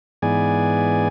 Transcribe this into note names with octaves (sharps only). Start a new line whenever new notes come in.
G#2 E3 B3 G#4 D5 G#5